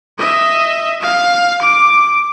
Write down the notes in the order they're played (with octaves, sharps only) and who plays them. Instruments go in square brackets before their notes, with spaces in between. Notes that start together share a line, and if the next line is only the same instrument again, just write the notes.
[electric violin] D#5 E5
F5
D6